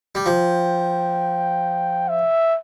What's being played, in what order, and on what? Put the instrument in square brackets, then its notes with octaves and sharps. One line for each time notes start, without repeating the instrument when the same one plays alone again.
[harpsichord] G3
[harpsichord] F3 [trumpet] G5
[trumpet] E5